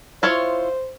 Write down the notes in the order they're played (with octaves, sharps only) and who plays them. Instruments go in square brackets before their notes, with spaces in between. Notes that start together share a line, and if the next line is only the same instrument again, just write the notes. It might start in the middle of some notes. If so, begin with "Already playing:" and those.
[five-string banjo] E4 F4 C#5 [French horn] C5